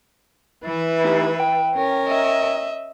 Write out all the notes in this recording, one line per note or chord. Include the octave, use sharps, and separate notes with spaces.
E3 B4 E5
A3 D#4 G4
G5
C#4 A#4
D#5 E5